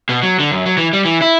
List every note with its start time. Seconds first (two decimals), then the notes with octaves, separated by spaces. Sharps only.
0.09 B2
0.23 F#3
0.39 D3
0.52 F#2
0.66 F#3
0.77 E3
0.93 G3
1.05 E3
1.22 E4